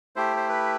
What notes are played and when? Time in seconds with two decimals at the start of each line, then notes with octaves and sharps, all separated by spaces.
0.16 A3 E4 G4 C5
0.36 C5
0.49 B4